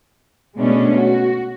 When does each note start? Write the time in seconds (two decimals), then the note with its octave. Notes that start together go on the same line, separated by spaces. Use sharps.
0.57 B2 G#3 A3 B3 C#4 D4
0.97 F#4